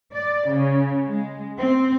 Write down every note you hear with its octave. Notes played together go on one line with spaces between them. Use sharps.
D5
C#3
G#3
C4